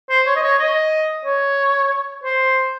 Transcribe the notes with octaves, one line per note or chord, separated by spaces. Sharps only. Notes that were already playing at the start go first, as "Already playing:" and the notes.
C5
C#5
D#5
C#5
D#5
C#5
C5